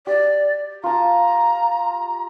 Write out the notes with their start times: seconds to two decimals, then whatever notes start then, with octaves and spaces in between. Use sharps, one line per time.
0.07 G4 D5
0.84 F4 A5 A#5